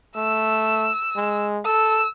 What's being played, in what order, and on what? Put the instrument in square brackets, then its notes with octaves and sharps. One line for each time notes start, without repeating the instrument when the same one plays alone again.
[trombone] A3 [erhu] E6
[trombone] G#3
[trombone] A4 [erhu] E6